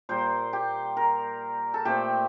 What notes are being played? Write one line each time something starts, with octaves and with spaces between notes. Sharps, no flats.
A#2 G3 A#3 C5
G4
A#4
A4
A#2 A3 C4 G4